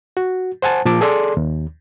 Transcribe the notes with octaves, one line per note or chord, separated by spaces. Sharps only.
F#4
C5 F#5 G#5 A5
A#2 F3 A5 D6
G#4 A4 D5 C6
D#2